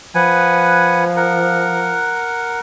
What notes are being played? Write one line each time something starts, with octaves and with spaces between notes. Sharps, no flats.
F3 B4 F#5 G#5
A#4 F#5